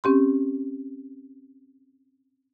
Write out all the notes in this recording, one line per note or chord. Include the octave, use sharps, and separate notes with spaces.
C4 C#4 G4 C6